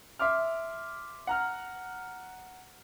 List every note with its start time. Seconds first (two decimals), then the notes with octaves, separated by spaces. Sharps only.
0.19 E5 C6 D6 F6
1.27 F#5 A#5 F6